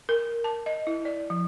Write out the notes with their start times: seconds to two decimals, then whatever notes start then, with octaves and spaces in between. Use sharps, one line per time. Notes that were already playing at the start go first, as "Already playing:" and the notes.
0.09 A#4
0.44 A5
0.66 D#5
0.87 E4
1.05 D5
1.30 F3